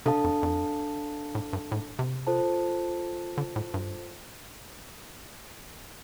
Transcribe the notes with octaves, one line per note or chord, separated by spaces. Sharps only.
C3 D4 A4 F5 A5
F2
F2
A2
G2
A2
C3
F4 A4 C5 A5
D3
A2
G2